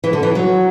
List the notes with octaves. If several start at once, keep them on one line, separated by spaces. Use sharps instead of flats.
E3
D3
E3
F#3